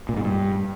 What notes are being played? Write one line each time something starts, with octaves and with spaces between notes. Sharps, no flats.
A#2
G#2
G2